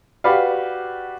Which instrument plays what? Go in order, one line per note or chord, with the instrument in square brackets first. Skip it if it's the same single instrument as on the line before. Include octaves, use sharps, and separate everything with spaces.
[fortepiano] F#4 G4 B4 D5 F5